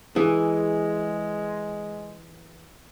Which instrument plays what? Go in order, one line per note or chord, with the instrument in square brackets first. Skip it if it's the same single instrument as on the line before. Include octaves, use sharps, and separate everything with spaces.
[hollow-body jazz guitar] E3 [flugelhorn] G#3 [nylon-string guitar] G#4